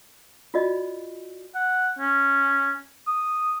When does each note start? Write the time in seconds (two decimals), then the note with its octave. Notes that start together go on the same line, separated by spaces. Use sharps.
0.54 F4 F#4 D5 D#5
1.55 F#5
1.99 C#4
3.07 D#6